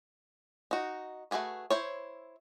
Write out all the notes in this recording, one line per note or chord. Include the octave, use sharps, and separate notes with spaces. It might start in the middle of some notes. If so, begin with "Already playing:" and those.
D#4 F#4
A3 C#4 F#4 G#4 B4
E4 C5 C#5